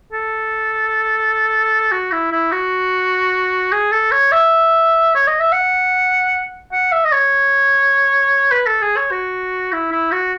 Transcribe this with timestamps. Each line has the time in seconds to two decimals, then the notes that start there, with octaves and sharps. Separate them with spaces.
0.12 A4
1.91 F#4
2.12 E4
2.32 E4
2.52 F#4
3.72 G#4
3.92 A4
4.12 C#5
4.32 E5
5.15 C#5
5.27 D#5
5.40 E5
5.52 F#5
6.72 F#5
6.92 E5
7.04 D#5
7.12 C#5
8.51 B4
8.66 A4
8.82 G#4
8.97 C#5
9.11 F#4
9.72 E4
9.92 E4
10.12 F#4